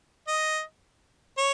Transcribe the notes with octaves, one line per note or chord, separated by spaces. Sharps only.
D#5
C#5